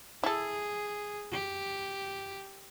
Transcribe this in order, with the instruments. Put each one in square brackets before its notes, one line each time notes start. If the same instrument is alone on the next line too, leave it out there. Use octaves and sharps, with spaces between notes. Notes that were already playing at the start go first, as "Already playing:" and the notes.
[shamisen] E4 A4 [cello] G#4
[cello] G4